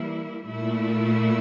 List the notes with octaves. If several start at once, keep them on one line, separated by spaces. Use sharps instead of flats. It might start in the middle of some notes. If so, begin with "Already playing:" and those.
Already playing: E3 G3 A#3 E4
A#2 A3 E4